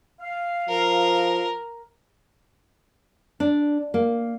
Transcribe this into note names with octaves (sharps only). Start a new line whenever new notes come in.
F5
F3 A#4
D4
A#3